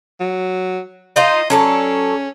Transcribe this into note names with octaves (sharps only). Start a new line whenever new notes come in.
F#3
D#4 F4 C5 D#5
F#3 C#4 A4 D5